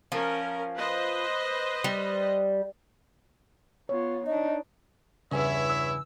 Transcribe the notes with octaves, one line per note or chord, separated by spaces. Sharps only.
F3 C#4 A#4
B4 C5 D#5
G3
B3 F4 C#5
D4 D#4 D#5
E2 G2 C#3 E4 C#5 E5 G#5
E6